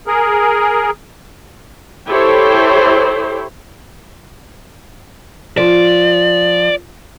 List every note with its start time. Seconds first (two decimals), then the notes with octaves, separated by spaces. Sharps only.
0.07 G#4 A#4
2.07 E4 G4 A4 C5 C#5
5.57 F3 D5